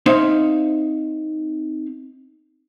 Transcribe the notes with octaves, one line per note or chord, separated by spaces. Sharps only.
C4 D#4 E5 F5